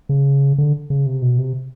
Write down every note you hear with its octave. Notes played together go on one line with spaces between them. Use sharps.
C#3
D3
C#3
C3
B2
C3